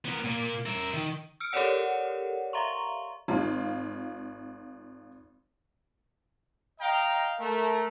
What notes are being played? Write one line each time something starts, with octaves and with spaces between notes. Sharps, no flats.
B3 A#4
A#2 A#3
A#4 E5
D#3
E6 F6 C#7 D7
G4 A4 A#4 C#5 D5 F#5
E5 F5 A#5 C6 C#6
G#1 F4
D#5 F5 G5 A#5
A3 A#4